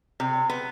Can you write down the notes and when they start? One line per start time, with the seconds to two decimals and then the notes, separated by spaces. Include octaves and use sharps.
0.20 C3
0.50 B3